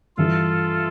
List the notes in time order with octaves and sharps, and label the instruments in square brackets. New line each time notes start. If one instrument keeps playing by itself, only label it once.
[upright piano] G2 E3 G3 [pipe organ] F4 A4